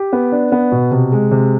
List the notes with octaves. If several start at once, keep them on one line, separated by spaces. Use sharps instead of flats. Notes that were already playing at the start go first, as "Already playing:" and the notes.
Already playing: G4
B3
D4
B3
B2
C3
G#3
C3